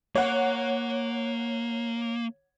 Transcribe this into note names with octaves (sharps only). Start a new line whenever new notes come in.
A#3 C#5 F#5